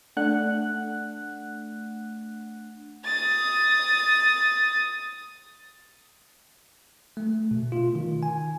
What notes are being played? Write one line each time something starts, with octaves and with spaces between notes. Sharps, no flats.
A3 D4 F#5 F#6
D#6 A6
A3
B2
F4
D#3
G#5